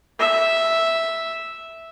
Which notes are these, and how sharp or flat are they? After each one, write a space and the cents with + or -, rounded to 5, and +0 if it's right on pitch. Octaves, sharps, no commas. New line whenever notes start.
E5 -5